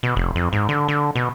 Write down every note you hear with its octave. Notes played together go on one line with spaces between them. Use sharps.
B2
F1
F2
G#2
D3
D3
B2